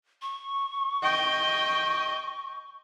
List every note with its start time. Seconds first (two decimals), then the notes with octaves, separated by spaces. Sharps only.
0.22 C#6
1.03 D#5 G5